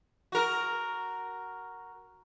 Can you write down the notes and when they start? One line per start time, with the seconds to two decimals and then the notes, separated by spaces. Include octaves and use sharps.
0.32 F#4 A#4